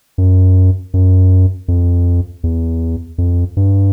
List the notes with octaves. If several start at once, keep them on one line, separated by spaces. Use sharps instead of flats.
F#2
F#2
F2
E2
F2
G2